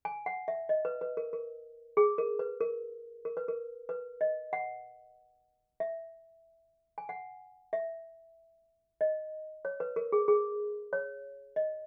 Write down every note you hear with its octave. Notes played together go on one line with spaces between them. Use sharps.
G#5
F#5
E5
D#5
B4
B4
A#4
A#4
G#4
A#4
B4
A#4
A#4
B4
A#4
B4
D#5
F#5
E5
G#5
F#5
E5
D#5
C#5
B4
A#4
G#4
G#4
C#5
D#5